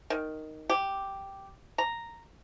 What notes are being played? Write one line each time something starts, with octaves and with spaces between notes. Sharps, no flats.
D#3
G4
A#5